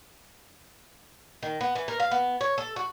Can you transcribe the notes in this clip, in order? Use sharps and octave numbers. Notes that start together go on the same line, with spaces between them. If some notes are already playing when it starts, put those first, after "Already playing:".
D#3
B3
E3
A#4
F5
B3
C#5
A4
F#4